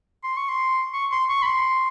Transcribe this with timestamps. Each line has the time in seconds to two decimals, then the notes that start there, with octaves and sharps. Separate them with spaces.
0.24 C6
0.37 C#6
0.49 C6
0.94 C#6
1.12 C6
1.29 C#6
1.42 B5
1.47 C6